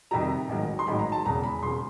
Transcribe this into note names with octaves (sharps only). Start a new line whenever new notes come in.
F2 C3 D#3 G3 A#5
A1 G#2 D#3 F#3
C6
A1 G#2 D#3 F#3 B5
A#5
A5
E1 E2 C#3 A#5
B5
E1 C#3 C6